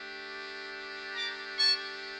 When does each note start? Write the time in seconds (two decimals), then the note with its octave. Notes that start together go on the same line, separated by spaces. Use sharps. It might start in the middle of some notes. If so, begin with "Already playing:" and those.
Already playing: A3 D4 G4
1.15 A#5 D6
1.58 A5 C#6